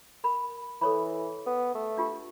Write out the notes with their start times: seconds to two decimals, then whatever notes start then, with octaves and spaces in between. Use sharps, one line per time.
0.24 A#4 B5
0.81 E3 A4 C#5 B5
1.46 B3
1.75 A3
1.97 D4 F4 G4